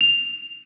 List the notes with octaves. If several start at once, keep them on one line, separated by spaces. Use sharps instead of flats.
F7